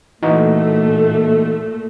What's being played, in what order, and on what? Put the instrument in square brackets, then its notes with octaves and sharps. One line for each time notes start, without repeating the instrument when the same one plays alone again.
[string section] A#2 A3 [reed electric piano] E3 D#4 F#4